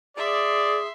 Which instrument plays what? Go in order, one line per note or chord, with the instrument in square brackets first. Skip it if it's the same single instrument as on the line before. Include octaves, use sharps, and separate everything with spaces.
[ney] G#4 [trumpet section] D5 [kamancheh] E5 C6